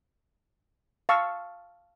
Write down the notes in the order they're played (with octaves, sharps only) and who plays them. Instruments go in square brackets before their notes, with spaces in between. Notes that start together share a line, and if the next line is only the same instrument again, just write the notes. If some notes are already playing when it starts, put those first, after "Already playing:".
[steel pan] F5 A5 C#6 E6